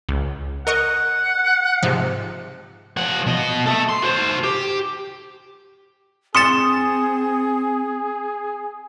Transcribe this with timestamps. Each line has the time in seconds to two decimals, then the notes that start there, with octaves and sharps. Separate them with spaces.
0.09 C#2
0.67 A#4 D#5 F#5 C#6
1.83 G#2 C3 F3
2.97 F3 F#5
3.26 B2 D#5
3.66 A4 E5
3.89 C6
4.02 F#4 C5
4.43 G4
6.35 C4 G#4 C6 D#6 A6 C#7 E7